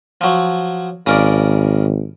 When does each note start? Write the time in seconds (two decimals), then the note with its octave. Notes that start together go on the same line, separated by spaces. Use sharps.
0.21 F3 F#3
1.06 G#1 C#3 A#4 D5